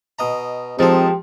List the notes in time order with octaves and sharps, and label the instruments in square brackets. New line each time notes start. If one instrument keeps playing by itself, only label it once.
[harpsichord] B2 D#5 A#5
[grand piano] F3 G#3 [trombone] C4 [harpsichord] D#4 A4 [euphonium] G4